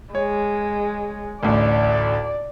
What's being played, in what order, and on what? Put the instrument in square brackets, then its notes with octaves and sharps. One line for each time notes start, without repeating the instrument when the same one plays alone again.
[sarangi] G#3 [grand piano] C#5
[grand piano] A1 D2 [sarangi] D5